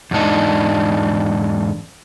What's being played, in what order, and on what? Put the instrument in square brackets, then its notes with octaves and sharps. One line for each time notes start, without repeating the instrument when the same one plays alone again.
[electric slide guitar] E2 G#2 D4 D#4